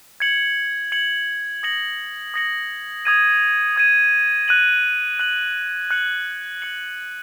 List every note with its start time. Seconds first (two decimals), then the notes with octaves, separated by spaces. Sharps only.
0.20 G#6 C#7 F#7
0.92 G#6 C#7 F#7
1.63 D#6 A#6 C#7 F#7
2.34 D#6 A#6 C#7 F#7
3.05 D#6 G#6 D#7
3.76 D#6 G#6 D#7
4.48 F#6 D#7 F#7
5.19 F#6 D#7 F#7
5.91 F#6 C#7 F#7
6.62 F#6 C#7 F#7